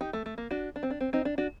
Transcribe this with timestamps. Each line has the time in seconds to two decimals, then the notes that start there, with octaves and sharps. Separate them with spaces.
0.01 D#4 G4
0.13 A3
0.26 A3
0.38 A#3
0.51 D4 F#4
0.76 D4
0.83 C4
0.90 D4
1.01 C4
1.13 C4 D#4
1.25 D4
1.38 D4 F#4